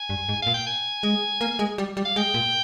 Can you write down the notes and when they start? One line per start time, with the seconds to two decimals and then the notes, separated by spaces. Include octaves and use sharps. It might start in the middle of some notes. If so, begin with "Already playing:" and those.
Already playing: G#5
0.09 G2
0.29 G#2
0.42 A#2 F5
0.54 G5
0.66 G#5
1.03 G#3
1.41 A#3
1.59 G#3
1.78 G3
1.97 G3
2.05 F5
2.16 G#3 G5
2.34 A#2